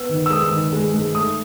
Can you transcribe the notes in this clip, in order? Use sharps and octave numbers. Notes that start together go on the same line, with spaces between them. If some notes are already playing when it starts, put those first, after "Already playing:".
Already playing: B3 E6
D#3
E6
G#3 D#6
E6
D#3
G#3
G#3
A3 D#6